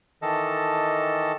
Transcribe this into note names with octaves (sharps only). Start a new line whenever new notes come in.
D#3 E3 A4 D#5 A5